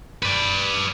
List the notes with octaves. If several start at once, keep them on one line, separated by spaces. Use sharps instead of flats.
B4 D5